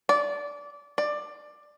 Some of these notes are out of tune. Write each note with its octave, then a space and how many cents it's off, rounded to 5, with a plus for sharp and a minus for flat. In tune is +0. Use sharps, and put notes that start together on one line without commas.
D5 -20
D5 +15